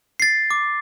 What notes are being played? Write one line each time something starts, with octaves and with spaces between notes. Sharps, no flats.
A6 C7
D6